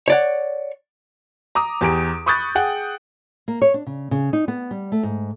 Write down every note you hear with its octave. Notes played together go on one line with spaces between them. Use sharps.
C#5 D5 F#5
A#5 D6 D#6
E2 G4 G#5 A#5 D7
B5 C#6 D#6 F#6 G6 A6
G#4 F#5 G5
A#3
C#5
D4
C#3
C#3
D#4
B3
G3
A3
G#2